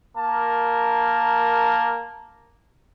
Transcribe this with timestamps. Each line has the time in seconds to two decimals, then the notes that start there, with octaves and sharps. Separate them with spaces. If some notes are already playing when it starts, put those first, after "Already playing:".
0.16 A#3 A#4 A5